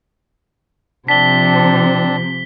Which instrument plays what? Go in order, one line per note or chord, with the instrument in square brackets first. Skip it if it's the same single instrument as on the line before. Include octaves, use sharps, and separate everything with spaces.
[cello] C3 F3 [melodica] C4 D4 A5 [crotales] B6 G7